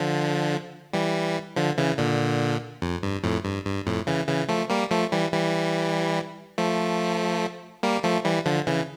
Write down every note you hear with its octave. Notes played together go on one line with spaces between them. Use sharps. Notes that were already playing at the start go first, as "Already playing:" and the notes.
Already playing: D3 F3
E3 G3
D3 F3
C#3 E3
A#2 D3
F2
G2
F2 A2
G2
G2
F2 A2
C#3 E3
C#3 E3
F3 A3
G3 A#3
F3 A3
E3 G3
E3 G3
F3 A3
G3 A#3
F3 A3
E3 G3
D3 F3
C#3 E3